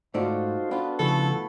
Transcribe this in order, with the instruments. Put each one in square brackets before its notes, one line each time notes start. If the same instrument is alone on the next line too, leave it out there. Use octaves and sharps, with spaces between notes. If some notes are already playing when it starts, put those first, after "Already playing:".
[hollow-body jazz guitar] G#2 A3 D5 [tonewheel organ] D#4 C5 [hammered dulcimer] F4 F#4 A4
[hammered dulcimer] B3 [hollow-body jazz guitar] D4 F4
[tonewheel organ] C#3 F3 [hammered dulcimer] A3 E4 G#4 [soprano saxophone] A4